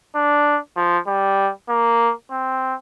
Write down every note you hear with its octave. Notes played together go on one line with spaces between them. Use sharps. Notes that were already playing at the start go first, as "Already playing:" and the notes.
D4
F3
G3
A#3
C4